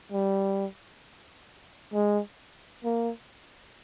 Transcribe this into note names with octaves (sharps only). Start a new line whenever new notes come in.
G3
G#3
A#3